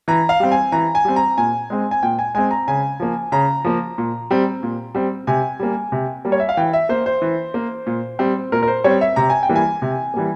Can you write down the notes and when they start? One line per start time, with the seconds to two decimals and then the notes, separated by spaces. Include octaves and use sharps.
0.08 E3 A#5
0.29 F5
0.40 G3 C4
0.52 G#5
0.72 E3 A#5
0.95 G#5
1.05 G3 C4
1.16 A#5
1.38 A#2 G#5
1.70 G#3 C4
1.91 G#5
2.03 A#2 G5
2.19 G#5
2.35 G#3 C4 G#5
2.51 A#5
2.68 C#3 G#5
3.00 F3 A#3
3.32 C#3 A#5
3.64 F3 A#3
3.98 A#2
4.31 G3 C4
4.63 A#2
4.95 G3 C4
5.27 C3 G#5
5.59 G3 A#3
5.92 C3
6.25 G3 A#3
6.32 C#5
6.40 E5
6.49 F5
6.57 E3 G5
6.73 E5
6.89 A#3 C5
7.06 C5
7.22 E3
7.54 A#3
7.87 A#2
8.19 G3 C4
8.52 A#2 A#4
8.63 A#4
8.68 C5
8.84 G3 C4 C#5
9.01 E5
9.16 C3 A#5
9.30 G#5
9.43 G5
9.49 E3 G3 A#3
9.56 G#5
9.82 C3
10.14 E3 G3 A#3